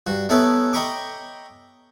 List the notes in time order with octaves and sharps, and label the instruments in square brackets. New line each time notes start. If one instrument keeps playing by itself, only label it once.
[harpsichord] G2 F#4
A3 B3 C#4 D#4 E4 B4
D#5 G5 A#5 B5 C#6 D6